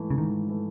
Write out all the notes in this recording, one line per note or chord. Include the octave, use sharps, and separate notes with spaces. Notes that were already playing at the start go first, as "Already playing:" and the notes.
Already playing: G#2 E3 A3
C#3
G#2 D#3
E3 A3